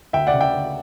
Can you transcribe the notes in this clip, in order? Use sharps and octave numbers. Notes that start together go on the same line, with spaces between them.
D2 E5 G5
D5 F#5
C#3
E5 G5
D2